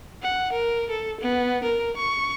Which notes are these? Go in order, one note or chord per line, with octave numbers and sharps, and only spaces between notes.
F#5
A#4
A4
B3
A#4
C#6